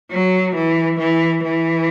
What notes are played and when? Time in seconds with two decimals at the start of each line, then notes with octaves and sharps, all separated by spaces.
0.12 F#3
0.55 E3
0.99 E3
1.43 E3